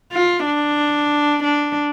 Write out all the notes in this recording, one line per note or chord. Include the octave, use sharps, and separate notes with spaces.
F4
D4
D4